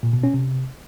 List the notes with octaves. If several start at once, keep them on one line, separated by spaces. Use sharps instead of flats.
A#2
B2
C#4
C3